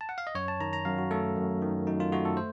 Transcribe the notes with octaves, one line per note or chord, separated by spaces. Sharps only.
A5
F#5
F5
D#5
F#2 C#5
A5
D#3 A#5
A#5
F#2 F5
F#4
A3 A4
F#2
D#3
F#2 D#4
F4
A3 F#4
A4
C5